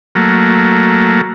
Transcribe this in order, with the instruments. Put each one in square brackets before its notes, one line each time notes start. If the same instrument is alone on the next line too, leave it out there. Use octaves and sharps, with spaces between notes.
[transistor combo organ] F#3 A3 A#3